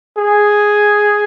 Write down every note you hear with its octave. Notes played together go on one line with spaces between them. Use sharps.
G#4